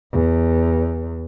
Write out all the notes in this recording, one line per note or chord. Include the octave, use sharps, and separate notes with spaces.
E2